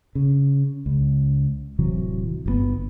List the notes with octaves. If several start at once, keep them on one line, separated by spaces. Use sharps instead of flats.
C#3
C#2
D1 C3 E3 F#3
G1 E3 B3